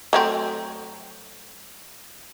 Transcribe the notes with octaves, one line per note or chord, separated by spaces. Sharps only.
F#3 A3 C4